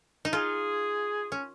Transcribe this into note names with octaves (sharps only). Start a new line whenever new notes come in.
D#4
F4 G#4
C#4